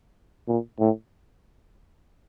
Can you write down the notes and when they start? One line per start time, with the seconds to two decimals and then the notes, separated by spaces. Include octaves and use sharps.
0.48 A#2
0.80 A2